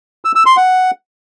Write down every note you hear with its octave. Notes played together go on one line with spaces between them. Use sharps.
E6
E6
C6
F#5